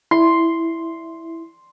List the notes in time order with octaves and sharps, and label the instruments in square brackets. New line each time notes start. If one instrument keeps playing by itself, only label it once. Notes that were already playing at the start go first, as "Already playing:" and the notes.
[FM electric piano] E4 [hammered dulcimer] C6